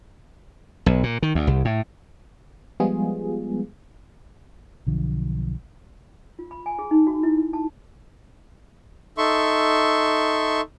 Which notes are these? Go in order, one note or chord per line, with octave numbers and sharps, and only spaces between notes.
B1
A#2
D#3
D2
C2
A2
F3 G3 G#3 B3 F4 G#4
B1 D3 F3
F4
B5
G#5
G#4
D#4
F#4
E4
E4
A5
D#4 A4 E5 C6 C#6